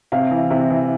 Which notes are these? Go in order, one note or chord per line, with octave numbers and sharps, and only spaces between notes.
C3 F5
E3
C3
E3